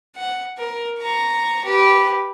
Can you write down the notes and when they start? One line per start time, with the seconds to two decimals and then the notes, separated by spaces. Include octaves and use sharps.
0.16 F#5
0.58 A#4
0.99 A#5 C#6
1.64 G4 B4